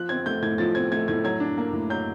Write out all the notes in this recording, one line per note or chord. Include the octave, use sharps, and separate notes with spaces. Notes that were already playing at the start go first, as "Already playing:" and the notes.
Already playing: F3 F#6
C4 G#6
A3 G6
A2 G#6
F3 A6
C4 G#6
A3 G#6
A2 G#6
F#3 G#6
D4
A#3
A2
F#3 G6